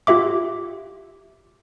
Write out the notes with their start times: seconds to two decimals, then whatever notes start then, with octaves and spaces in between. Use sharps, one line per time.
0.07 F4 G4 E5 D6